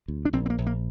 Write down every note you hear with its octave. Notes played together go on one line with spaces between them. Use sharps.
D2
D4
A#1 C4
C4
A#3
A#1
A#3